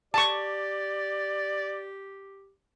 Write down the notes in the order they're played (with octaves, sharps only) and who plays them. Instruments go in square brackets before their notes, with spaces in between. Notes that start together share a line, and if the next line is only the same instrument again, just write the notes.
[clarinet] G4 [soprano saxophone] D5 [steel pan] A5 C#6